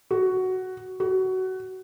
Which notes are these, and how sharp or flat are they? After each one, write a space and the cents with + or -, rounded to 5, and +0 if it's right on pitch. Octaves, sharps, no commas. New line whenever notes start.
F#4 +10
F#4 +20